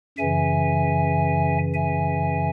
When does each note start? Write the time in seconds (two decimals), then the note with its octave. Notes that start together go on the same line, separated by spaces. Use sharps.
0.18 F#2 C#3 E3 E5 G#5
1.74 E5 G#5